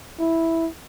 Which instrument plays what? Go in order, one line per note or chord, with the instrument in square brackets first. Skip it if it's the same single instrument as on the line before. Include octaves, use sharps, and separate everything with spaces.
[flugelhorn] E4